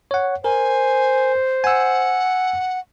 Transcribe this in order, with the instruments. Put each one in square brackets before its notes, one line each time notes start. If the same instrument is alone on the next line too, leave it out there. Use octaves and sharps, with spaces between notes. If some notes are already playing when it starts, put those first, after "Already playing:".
[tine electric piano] C#5 F#5
[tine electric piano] A#4 [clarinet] C5 [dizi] G#5
[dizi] F#5 [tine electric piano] G#5 E6